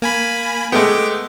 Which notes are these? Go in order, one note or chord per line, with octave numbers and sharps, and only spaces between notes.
A#3 G#5 B5
G#3 A3 B3 G5 D6